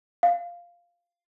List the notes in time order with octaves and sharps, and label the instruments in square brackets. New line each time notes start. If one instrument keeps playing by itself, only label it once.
[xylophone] F5